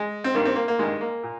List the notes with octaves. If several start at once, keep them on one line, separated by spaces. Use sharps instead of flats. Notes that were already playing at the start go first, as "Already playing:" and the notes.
Already playing: G#3
C4
G2 D#3 A#3
C4
A#3
A#3
G2 D#3 G#3
A#3
A#2